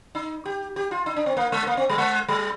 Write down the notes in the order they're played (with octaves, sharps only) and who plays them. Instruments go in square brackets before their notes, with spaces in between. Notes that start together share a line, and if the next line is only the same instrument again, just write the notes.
[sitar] D#4
G4
G4
F4
D#4
D4
C4
A#3
G#3
A#3
C4
G3
G#3
G3